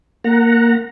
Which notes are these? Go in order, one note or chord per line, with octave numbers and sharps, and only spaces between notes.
A#3 F#5 A#5